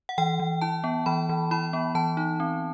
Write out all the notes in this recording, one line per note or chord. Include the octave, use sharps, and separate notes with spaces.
F#5
E3 G5
E3
E4 A5
B3
E3 B5
E3
E4 B5
B3
E3 A5
D#4
C4